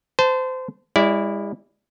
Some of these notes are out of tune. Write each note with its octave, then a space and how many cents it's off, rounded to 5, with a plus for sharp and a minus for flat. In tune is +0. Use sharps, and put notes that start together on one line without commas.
C5 -25 A5 +0
G#3 -45 E4 +0 D5 -20